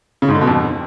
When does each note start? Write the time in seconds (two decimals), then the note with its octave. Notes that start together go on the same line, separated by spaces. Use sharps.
0.22 C#3
0.28 G#2
0.35 D3
0.41 B2
0.47 F2